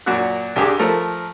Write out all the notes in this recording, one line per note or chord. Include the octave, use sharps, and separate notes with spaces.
F#2 A#2 F#4 F#6
C2 G2 D4 G4 G#4 D6
F3 A3 A#4